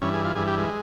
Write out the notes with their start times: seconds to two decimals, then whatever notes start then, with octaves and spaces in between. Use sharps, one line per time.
0.02 G2 E3 C#4
0.14 G#4
0.24 F4
0.35 G2 E3 G#4
0.47 G4
0.58 G#3